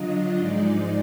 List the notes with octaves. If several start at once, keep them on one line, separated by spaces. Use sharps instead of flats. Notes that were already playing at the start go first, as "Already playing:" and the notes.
Already playing: D3 F#3 D4 F4 D#5
G#2 F3 G#3 D#4 D5